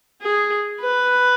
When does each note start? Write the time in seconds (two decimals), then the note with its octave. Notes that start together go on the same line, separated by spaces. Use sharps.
0.22 G#4
0.81 B4